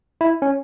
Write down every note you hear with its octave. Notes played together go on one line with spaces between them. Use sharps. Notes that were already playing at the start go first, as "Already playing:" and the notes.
E4
C#4